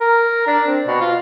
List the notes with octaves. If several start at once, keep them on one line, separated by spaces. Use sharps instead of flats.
A#4
D4
C4
B2
F4